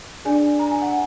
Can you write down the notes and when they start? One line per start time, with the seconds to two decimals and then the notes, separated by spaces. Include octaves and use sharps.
0.25 D4 G#4 D5 G#5
0.59 A#5
0.71 G#5
0.82 F#5